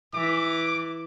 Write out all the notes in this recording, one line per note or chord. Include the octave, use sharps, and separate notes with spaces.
E3 D6